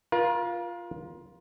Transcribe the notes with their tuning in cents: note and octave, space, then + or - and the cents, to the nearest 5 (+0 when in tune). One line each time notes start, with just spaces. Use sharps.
F4 +0 A#4 +40